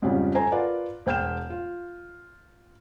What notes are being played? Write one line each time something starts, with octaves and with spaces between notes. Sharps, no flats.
F2 G#2 C#3 F3 G3 C#4
A4 C5 G#5 A#5
F4 A#4 B4 D5 F#5
E1 C5 G5 F6 G6 E7
F4